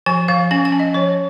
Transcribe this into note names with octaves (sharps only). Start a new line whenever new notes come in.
F3 G#5
F3 F5
C#4 G#5
G#5
C#4
D#5
F3 C#5